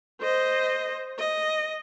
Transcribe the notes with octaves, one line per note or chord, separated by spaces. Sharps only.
C5 D#5
D#5